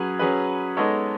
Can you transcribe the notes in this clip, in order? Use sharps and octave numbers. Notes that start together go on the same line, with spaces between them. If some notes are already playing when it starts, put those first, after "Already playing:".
Already playing: F#3 C#4 G#4 B4
F#3 C#4 G#4 B4
G#3 B3 D#4 A4 C#5